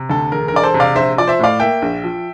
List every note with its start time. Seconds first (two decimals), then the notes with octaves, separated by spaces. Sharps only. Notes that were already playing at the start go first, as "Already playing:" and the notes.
Already playing: C3
0.10 D2 A4
0.32 E1 A#4
0.48 A#4
0.54 E1 D5
0.63 A4 C5
0.74 C3
0.80 D5 F5
0.96 A#1 C5 E5
1.18 F3 D5
1.27 C5 E5
1.39 A2 D5 F5
1.60 A#3 E5 G5
1.82 A#1
2.04 F3